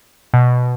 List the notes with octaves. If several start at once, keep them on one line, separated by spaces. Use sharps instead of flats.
B2